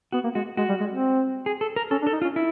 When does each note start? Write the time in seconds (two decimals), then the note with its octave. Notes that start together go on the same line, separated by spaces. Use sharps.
0.12 B3 F#4
0.24 A#3
0.35 G#3 F#4
0.57 G#3 F#4
0.69 G3
0.80 G#3
0.90 C4
1.46 G#4
1.61 A4
1.76 A#4
1.91 C#4 A4
2.02 D4
2.07 A4
2.13 D#4
2.22 F4
2.24 C#4
2.36 E4